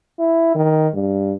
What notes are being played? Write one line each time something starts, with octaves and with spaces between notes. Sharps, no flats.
E4
D#3
G2